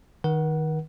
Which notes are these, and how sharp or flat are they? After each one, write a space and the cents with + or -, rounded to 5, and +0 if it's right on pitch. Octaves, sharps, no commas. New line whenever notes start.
D#3 +0 A#4 +45 F#5 +15